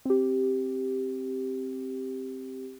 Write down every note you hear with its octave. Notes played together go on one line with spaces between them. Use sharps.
C4 G4